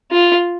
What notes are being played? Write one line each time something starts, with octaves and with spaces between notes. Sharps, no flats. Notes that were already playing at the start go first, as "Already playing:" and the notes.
F4